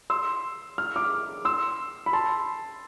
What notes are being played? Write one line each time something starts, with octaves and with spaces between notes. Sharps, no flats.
C6 E6
F6
D6 F6
C6 E6
B5
A5 C6